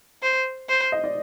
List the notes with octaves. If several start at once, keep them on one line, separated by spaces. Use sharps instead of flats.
C5
C5
D#5
D5